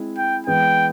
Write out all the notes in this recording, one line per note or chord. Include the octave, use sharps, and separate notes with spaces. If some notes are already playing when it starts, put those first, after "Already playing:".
Already playing: G#3 C4 E4
G5
E3 G#3 B3 G5